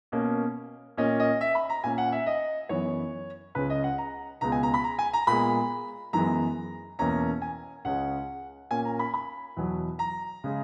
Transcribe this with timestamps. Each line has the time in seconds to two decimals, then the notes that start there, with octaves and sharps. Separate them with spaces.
0.12 B2 A#3 C#4
0.97 A#2 A#3 C#4 D#5
1.20 D#5
1.41 E5
1.55 B5
1.70 A#5
1.84 A#2 A#3 C#4 G#5
1.98 F#5
2.12 E5
2.26 D#5
2.69 F#2 E3 B3 C#5
3.55 C#2 C#3 G#3 C#4 B4
3.70 D#5
3.84 F#5
3.98 A#5
4.41 C#2 B2 G#3 B3 A#5
4.52 G#5
4.63 A#5
4.74 B5
4.84 A#5
4.99 G#5
5.13 A#5
5.27 A#2 G#3 B3 B5
6.13 F#2 E3 G#3 B3 A#5
6.99 E2 B2 A#3 C#4 A#5
7.42 G#5
7.85 C#2 C#3 G#3 C#4 F#5
8.71 A#2 A#3 C#4 G#5
8.85 A#5
8.99 B5
9.14 B5
9.57 E2 B2 F#3
9.99 A#5
10.44 C#3 G#3